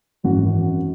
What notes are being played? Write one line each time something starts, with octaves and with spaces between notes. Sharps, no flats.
G#1 F#2 C#3 E3 F#4